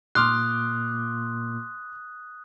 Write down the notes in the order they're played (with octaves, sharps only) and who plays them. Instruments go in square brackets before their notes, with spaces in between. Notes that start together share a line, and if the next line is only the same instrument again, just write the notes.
[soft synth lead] A#2 [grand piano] C6 D6 F6 [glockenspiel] D#6 F#6